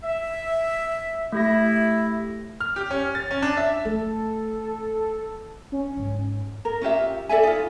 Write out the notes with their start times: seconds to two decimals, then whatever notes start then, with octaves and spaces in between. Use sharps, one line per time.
0.04 E5
1.32 A3 E4 G4 A#6
2.61 F6
2.76 G4
2.91 C#4
3.15 A6
3.31 C#4
3.42 D4
3.57 E5
3.85 A3 A4
5.72 C#4
5.97 G#2
6.65 A#4
6.82 C#4 F4 G4 E5
7.29 A4 D5 E5 G#5
7.43 D#4 F4